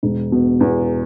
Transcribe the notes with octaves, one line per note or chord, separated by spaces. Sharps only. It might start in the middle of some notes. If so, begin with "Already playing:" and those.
E1
B2
E2